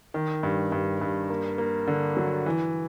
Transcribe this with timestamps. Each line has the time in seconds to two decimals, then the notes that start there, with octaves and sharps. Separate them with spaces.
0.14 D#3
0.43 G2
0.72 G2
1.01 G2
1.29 A#3
1.58 A#3
1.87 D3
2.17 F#3
2.46 E3